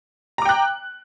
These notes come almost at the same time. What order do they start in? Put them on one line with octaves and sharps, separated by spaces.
A#5 D6 G5 F#6